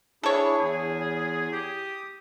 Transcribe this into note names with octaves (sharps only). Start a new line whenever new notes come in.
D4 E4 G#4 A4 C#5
E2 G#4
G4 D#6